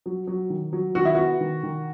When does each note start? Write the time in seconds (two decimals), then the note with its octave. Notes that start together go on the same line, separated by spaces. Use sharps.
0.06 F#3
0.27 F#3
0.50 D#3
0.73 F#3
0.95 D#3 F#4
1.05 E4
1.15 B3 F#4
1.40 D#3
1.63 D#3